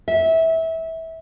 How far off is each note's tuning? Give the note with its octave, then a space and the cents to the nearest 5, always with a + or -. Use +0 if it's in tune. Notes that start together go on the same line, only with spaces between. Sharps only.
E5 -20